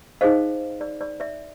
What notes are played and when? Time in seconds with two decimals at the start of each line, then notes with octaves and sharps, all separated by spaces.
0.21 D#4 G#4 C5 D#5 F5
0.81 D5
1.01 D5
1.20 D5 E5